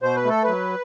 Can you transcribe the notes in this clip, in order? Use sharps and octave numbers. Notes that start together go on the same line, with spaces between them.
B2 C5
B4
A3 A4
F#3 B4